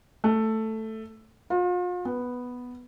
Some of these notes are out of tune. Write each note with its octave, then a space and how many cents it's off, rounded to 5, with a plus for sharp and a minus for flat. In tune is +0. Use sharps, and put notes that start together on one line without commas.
A3 +5
F4 +40
B3 +0